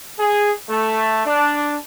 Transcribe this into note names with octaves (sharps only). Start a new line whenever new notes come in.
G#4
A3
D4